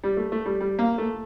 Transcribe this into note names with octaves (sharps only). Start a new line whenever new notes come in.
G3
A3
A3
G3
G3
A#3
A3